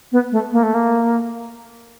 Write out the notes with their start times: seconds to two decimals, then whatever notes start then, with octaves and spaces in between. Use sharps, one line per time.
0.12 B3
0.32 A3
0.52 A#3
0.63 A3
0.74 A#3